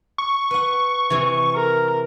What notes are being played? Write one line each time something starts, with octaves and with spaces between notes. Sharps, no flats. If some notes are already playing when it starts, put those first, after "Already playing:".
C#6
B4 F#5
C3 E3
A#4